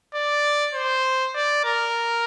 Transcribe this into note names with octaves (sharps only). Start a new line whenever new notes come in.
D5
C5
D5
A#4